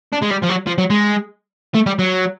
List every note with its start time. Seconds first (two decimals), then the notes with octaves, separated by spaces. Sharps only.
0.12 D4
0.22 G#3
0.30 G3
0.42 F3
0.49 F#3
0.67 F3
0.78 F#3
0.90 G#3
1.75 A3
1.86 G3
1.99 F#3